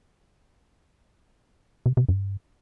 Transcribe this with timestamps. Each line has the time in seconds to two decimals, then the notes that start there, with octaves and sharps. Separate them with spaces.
1.86 C3
1.97 C3
2.09 G2